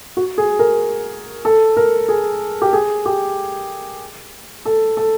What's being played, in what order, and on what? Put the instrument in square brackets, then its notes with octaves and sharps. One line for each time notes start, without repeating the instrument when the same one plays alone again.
[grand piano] F#4
G#4
A#4
A4
A#4
G#4
G4
G#4
G4
A4
A4